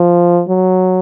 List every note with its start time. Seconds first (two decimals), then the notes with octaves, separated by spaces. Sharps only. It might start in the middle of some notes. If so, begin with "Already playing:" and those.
Already playing: F3
0.49 F#3